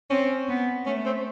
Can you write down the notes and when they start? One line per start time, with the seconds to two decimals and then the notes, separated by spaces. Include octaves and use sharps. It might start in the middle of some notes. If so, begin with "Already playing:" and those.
0.11 C4 C#4
0.49 B3
0.86 A3 C#4
1.06 C4